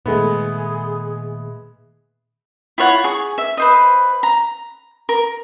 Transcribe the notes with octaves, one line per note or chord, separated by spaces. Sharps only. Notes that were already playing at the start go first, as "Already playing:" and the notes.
A#2 D#3 G#3 A3 B3 G#4
E4 F4 C#5 F#5
G#4 C#6
E5
B4 C5 D#5
A#5
A#4